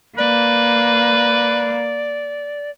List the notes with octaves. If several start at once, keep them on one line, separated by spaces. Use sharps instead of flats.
A#3 B4 D5